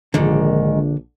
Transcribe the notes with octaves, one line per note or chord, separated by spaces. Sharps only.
A#1 G#2 D3 D#3